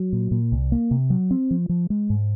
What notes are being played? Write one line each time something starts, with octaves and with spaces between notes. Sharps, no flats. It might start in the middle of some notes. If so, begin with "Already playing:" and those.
Already playing: F#3
A#2
A#2
C2
A#3
C3
F#3
C4
F3
F3
G#3
G#2